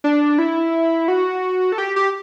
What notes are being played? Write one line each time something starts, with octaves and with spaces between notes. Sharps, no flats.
D4
E4
F#4
A4
G4
G4